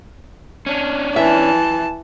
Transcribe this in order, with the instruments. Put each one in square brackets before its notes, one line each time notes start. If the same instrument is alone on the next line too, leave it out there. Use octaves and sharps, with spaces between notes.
[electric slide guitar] C#4 D4
[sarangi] E3 [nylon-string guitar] E5 [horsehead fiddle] A5